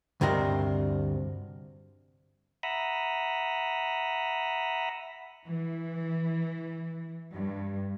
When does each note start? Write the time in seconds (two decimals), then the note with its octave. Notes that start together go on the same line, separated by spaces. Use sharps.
0.21 D2 G2 C3 C4 A#4 D#5
2.63 E5 F#5 A#5 B5 D#6 E6
5.44 E3
7.33 G2